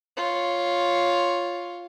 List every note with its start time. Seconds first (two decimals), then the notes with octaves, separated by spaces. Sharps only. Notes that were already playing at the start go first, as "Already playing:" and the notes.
0.17 F4 C#5